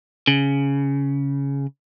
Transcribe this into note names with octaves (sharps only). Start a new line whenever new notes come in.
C#3